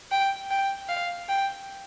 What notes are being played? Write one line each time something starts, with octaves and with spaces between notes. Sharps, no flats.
G5
G5
F5
G5